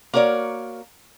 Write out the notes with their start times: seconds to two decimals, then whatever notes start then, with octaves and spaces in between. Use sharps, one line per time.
0.13 A#3 F#4 A#4 C#5 D5